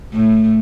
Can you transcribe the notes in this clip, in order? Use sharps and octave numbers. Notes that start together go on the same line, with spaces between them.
A2 A3